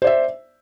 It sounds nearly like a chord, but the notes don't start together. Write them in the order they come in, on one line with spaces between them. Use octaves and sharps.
C5 D5 E5